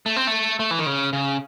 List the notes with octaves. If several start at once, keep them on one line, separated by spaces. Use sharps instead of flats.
A3
C4
A3
A3
E3
D#3
C#3
C#3